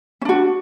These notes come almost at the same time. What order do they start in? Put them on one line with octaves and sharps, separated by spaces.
C#4 D4 F#4